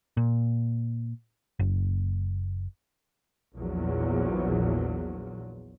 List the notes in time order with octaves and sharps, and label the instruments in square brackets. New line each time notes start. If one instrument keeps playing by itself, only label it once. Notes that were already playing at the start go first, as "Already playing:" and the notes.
[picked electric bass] A#2
F#1
[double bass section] A#1 E2 F3 F#3